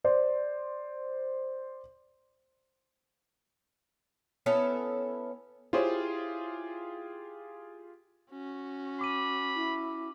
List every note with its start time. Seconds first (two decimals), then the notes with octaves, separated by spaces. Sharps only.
0.04 C5 D5
4.46 B3 C#4 E4 A4
5.73 E4 F4 G4 G#4 C5 C#5
8.30 C#4 F#4
9.01 B5 D6 D#7
9.55 E4